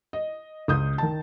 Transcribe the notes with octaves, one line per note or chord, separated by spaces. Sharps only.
D#5
C#2 D#6 G6
D#3 A5